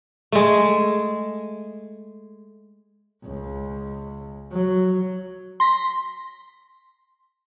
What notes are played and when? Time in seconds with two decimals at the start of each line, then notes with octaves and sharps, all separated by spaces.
0.32 G#3 A3
3.24 C#2
4.52 F#3
5.60 C6 A#6 B6